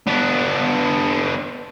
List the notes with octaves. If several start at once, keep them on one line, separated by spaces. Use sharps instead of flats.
B3 D4